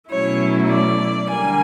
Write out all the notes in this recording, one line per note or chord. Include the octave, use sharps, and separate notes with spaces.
B2 F#3 A3 C#4 E4 C#5
D5
D3 G3 A#3 G#5